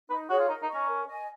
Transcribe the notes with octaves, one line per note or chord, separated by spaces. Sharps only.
D#4 B4
F#4 G#4 C#5
F4
D#4 A#4
D#4
D#5 A#5 C#6
C#4
A#4
D#5 G#5